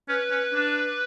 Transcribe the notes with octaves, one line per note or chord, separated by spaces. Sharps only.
C#4 B4
C#4
D4